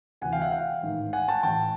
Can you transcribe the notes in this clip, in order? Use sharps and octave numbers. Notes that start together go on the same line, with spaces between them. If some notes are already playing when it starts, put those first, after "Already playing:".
D2 C3 E3 F#5 G#5
F5 G5
E5 F#5
F5 G5
A1 G#2 D#3
F#5 G#5
G5 A5
A1 A2 E3 G5 A5